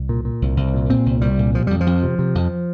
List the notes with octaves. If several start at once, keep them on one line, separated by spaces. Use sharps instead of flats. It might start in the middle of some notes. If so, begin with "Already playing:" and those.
Already playing: C2
A#2
A#2
C2
C2
A#2
A#2 C4
C2
C2 G3
A#2
C3 F3
F2 G3
F3
F2
C3
C3
F2